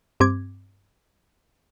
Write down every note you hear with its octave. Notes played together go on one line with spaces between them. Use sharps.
G2 C4 D6 G#6